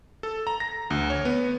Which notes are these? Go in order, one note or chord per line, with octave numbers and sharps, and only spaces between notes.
A4
A#5
A#6
D2
C#5
B3